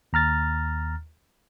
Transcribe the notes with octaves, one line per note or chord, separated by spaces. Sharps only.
D#2 A#5 F6 A6